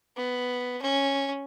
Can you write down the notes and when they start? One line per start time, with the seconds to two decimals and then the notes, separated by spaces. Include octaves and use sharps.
0.17 B3
0.82 C#4